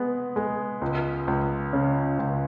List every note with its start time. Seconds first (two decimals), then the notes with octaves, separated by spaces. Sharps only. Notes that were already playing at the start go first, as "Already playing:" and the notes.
Already playing: G#3 B3
0.36 G#3
0.82 C#2
1.27 C#2
1.73 C#3
2.19 C#2